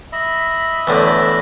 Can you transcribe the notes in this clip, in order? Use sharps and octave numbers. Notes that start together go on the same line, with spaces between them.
D#5 E5 B5
E2 A2 D3